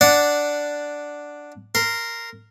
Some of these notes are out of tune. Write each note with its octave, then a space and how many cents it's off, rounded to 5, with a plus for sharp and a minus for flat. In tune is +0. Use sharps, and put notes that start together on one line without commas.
D4 +0 D5 +0 F#5 +0
A#4 -10 C6 -5